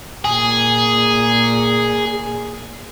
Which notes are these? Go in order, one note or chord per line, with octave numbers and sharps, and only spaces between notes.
A#2 G#4